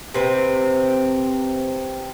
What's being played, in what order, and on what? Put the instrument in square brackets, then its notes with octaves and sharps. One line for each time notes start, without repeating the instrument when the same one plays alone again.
[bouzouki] C3 C4 B4